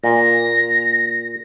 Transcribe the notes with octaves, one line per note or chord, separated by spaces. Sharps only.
A#2 A#6